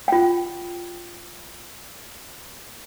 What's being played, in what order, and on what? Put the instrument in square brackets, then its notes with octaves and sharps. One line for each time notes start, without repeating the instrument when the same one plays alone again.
[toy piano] F4 G5